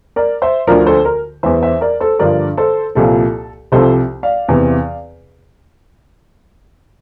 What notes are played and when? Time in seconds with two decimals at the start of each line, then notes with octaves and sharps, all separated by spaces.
0.16 A#4 D5
0.42 C5 E5
0.67 D2 D3 F3 A#4 D5
0.86 A4 C5
1.05 A#4
1.43 E2 E3 C5 E5
1.63 C5 E5
1.81 A#4 D5
2.00 A4 C5
2.19 G2 D3 F3 A#4 D5
2.57 A4 C5
2.95 C2 A#2 F3 A4
3.72 C2 C3 F3 A4 C5
4.23 D5 F5
4.48 E2 C3 E3